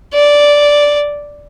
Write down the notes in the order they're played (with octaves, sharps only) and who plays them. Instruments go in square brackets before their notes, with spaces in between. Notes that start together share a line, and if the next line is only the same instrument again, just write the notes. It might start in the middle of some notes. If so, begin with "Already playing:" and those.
[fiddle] D5